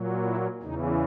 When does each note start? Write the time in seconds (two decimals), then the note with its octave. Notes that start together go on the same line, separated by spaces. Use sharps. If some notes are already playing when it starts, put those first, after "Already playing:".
Already playing: A#2 F#3
0.25 E4
0.62 E2 C#3 E3 D#4